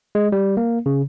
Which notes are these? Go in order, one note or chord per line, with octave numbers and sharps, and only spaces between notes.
G#3
G3
A#3
C#3